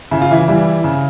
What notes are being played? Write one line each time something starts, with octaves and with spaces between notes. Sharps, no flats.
C#3 E4
F4
E3 E4
E3 G3
C#3